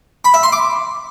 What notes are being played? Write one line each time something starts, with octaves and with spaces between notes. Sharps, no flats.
B5
E5
C6
D6